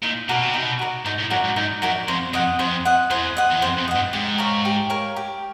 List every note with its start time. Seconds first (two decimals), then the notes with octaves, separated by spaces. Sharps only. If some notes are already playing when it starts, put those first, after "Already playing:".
0.03 A#2 D#4
0.29 B2 F#4 A#4 D5
0.42 C3
0.54 B2 D#4
0.79 F#4 A#4 D5
1.05 G#2 D#4
1.19 A2
1.30 F#2 F#4 A#4 D5
1.44 G#2
1.56 G#2 D#4
1.82 F#2 F#4 A#4 D5
2.08 F2 C5
2.33 F2 D#5 F#5
2.59 F2 C5
2.85 D#5 F#5
3.11 E2 C5
3.37 D#5 F#5
3.52 E2
3.62 F2 C5
3.79 F2
3.88 D#5 F#5
3.96 G2
4.13 G#2 G4
4.38 A#4 C#5 F5
4.65 G4
4.90 A#4 C#5 F5
5.16 G4